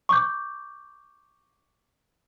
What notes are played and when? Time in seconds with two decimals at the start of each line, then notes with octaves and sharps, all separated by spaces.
0.09 C#6 D6 G6